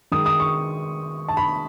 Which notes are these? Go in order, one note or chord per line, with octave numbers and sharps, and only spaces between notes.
D#3 G#3 D#6
D#6
C#6
A5
B5